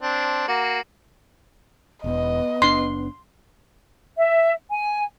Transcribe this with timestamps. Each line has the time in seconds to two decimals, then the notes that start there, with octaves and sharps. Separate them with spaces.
0.02 C4 D4
0.48 A#3 F#4
2.04 E1 E2 B3 D#5
2.62 F#1 D4 C6
4.17 E5
4.71 G#5